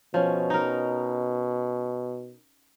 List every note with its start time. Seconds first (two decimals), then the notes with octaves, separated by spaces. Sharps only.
0.14 B2 F3 C#4
0.50 D#4 A#4